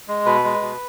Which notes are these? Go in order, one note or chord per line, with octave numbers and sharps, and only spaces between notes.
G#3
B2 B4
G#3
B2